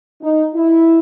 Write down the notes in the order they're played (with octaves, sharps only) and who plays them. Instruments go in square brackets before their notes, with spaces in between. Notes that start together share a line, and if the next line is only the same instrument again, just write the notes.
[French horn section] D#4
E4